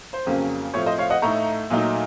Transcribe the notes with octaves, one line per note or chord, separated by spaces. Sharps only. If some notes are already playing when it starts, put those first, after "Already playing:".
C5
F2 C#3 F#3 A#3 C#4
A2 F3 C4 F4 C#5
C5 D#5
C#5 F5
D#5 F#5
A2 A3 D#4 A#5 C#6
A#2 F#3 A3 D#4